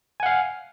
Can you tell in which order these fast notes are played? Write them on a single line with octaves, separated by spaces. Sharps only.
G#5 F#5 F5